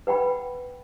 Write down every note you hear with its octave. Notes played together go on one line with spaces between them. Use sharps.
B4 F#5 G5 B5